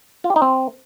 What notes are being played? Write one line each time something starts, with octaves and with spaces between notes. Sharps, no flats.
F4
G4
D#4
C4